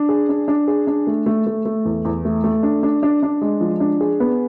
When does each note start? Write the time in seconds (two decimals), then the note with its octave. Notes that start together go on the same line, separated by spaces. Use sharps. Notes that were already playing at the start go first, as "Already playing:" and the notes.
Already playing: D4
0.09 G#4
0.29 D4
0.48 D4
0.68 G#4
0.87 D4
1.07 A3
1.26 A3
1.46 A3
1.65 A3
1.85 E2
2.05 E2
2.25 A3
2.44 A3
2.63 D4
2.83 D4
3.03 D4
3.23 D4
3.41 G#3
3.61 F3
3.80 D4
4.01 G#4
4.20 B3